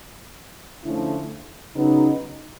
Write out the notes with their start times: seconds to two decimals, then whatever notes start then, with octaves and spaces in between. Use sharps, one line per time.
0.83 D3 F3 A3 C#4 E4
1.75 C#3 F#3 B3 D#4